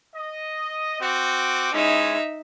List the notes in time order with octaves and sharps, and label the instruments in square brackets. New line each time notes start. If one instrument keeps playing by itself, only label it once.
[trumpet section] D#5
C4 F#4 D6
[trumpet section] G#3 C#4 E4 [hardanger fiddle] D#4 E5